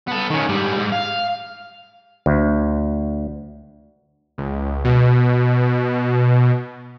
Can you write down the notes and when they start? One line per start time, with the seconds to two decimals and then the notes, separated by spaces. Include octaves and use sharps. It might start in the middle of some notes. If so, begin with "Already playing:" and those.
0.07 B3 A4
0.30 D#3 C#4
0.49 G#2 G3
0.76 G#2
0.92 F5
2.26 D2
4.38 C#2
4.85 B2